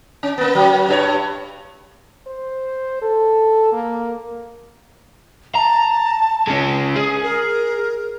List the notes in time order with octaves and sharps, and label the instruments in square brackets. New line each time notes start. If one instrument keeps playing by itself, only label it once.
[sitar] C#4
A#3 B3
F#3
G2 G4 C#5
[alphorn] C5
A4
A#3
[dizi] A5 [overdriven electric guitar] A#5
[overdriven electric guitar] G#3 C#4
G#4
[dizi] A#4